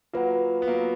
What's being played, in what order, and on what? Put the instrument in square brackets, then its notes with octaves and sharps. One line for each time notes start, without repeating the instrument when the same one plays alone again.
[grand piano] F#3 A#3 [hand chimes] F4 B4 F#5
[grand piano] B3
F#3 A#3